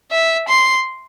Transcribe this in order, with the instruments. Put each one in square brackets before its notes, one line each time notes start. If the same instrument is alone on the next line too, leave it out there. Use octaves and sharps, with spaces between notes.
[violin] E5
C6